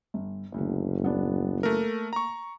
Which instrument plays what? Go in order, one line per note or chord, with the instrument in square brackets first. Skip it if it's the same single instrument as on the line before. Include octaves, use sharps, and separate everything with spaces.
[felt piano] G1
[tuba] F#1 [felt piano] D2 D3
[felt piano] D#1 B3 D4
[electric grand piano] A3 A#4 [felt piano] A#3
[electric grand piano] A#5 C#6